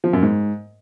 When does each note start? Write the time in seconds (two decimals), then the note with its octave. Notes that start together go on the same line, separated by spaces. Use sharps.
0.04 F3
0.13 F#2
0.23 G#2